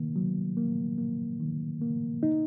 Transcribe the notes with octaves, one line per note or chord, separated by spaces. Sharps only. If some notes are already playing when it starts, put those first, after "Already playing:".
Already playing: C3 D#3 A#3
F#3
A#3
A#3
D#3
A#3
D#4